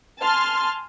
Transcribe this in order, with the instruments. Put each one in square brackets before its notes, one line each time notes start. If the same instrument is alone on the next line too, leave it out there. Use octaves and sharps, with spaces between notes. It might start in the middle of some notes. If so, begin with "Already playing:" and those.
[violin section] G#5 A5 C6 F6